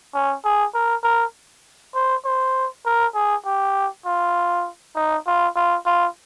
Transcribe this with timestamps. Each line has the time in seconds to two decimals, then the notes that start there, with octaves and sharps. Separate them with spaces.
0.14 C#4
0.44 G#4
0.74 A#4
1.03 A#4
1.94 C5
2.25 C5
2.85 A#4
3.14 G#4
3.46 G4
4.05 F4
4.96 D#4
5.26 F4
5.56 F4
5.86 F4